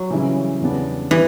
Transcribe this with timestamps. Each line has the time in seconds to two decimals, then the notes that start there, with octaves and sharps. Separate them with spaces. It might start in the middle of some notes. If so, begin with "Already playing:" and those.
Already playing: F#3
0.10 C#3 E3 G3 C#4 E4
0.61 E2 C#3 G3 B3 D4
1.11 E3 G3